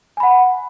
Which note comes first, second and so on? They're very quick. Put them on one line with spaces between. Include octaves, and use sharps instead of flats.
G#5 B5 F#5